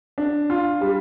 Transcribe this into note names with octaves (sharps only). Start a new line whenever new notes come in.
D4
F4
G3